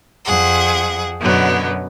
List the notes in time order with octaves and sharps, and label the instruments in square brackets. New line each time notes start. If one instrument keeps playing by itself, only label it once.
[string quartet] F2 G#4 F#5
F#2 B2 D3 F#3 B3